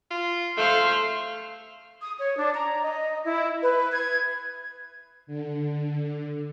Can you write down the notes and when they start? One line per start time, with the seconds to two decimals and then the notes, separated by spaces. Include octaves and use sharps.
0.11 F4
0.58 A3 C5 F5
2.01 D#6
2.18 C#5
2.37 D4
2.53 A#5
2.82 D#5
3.24 E4
3.62 B4
3.92 G#6
5.27 D3